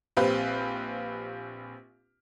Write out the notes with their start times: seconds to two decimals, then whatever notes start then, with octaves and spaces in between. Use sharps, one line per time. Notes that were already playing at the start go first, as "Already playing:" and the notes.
0.17 A#1 C4 G4 B4 F5 B5